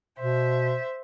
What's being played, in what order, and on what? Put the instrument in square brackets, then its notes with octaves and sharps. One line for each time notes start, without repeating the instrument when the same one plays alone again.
[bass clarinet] B2 [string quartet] C5 E5